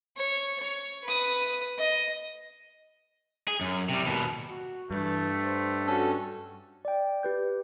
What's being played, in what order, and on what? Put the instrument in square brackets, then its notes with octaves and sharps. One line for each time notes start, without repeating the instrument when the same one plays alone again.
[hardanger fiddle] C#5
C#5
B4 D#6
D#5
[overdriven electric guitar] G#4
F#2
C3 G3
D#2 B2
[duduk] F#4
[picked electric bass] G2 [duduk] E3 [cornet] A3
[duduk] C5
[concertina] C#4 A4 [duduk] F#4
[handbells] D5 G5
G4 B4 G6